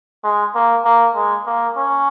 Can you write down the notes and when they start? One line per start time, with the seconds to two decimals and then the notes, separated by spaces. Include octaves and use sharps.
0.24 G#3
0.55 A#3
0.85 A#3
1.15 G#3
1.46 A#3
1.77 C#4